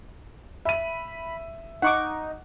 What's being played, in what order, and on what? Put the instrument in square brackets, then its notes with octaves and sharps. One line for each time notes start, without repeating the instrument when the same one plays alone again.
[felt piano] E5 D#7 [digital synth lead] B5
[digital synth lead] D#4 [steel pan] F#5 C#6 D6